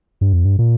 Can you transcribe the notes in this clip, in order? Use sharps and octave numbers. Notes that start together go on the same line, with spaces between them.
G2
F2
G2
A#2